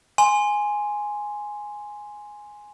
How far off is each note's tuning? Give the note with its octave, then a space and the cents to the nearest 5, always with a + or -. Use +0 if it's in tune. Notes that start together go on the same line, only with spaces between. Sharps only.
G#5 +0 C6 +0